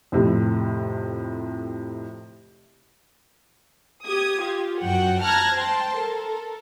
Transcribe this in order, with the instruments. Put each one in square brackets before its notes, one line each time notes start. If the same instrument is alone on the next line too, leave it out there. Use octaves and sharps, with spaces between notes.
[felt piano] F2 A2 C3
[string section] G4 D#6 G#6
F4 G4
F#2 F#4 F#5 G5
A5 A#5 F6 F#6 G#6 A#6
C5 G5 A5 C6
A4 A#4